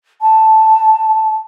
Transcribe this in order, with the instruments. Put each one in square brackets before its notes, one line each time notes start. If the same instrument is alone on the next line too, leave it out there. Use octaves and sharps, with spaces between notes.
[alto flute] A5